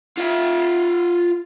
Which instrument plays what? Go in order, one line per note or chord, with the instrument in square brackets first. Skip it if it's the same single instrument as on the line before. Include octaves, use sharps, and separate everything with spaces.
[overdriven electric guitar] F4 E5